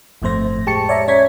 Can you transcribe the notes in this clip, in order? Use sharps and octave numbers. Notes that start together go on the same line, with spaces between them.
G1 F2 A2 A3 C5 A#6
G#3 G4 A5 C#6 C#7
C#5 D5 E5 A#5
C#4 C#5 G#6 B6